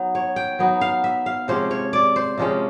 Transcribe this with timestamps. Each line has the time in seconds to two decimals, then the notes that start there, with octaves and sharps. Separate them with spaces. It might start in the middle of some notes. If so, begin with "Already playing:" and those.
Already playing: F#3 B3 D#4
0.15 C#5
0.36 G5
0.59 F#3 B3 D#4
0.81 F5
1.04 E5
1.26 F5
1.48 C3 F3 G#3 C#4 C5
1.71 C#5
1.93 D5
2.16 C5
2.38 C3 F3 G#3 C#4